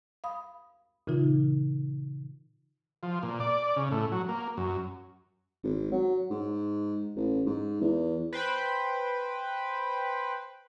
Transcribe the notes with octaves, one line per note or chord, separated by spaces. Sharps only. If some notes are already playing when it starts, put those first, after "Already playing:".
F5 B5 D#6
A#2 C#3 E3 D#4 F4
F3
A#2
D5
C#3
A2
F#3
A#3
F#2
G#1
F#3
G#2
A1
G#2
E2
B4 C5 G5 B5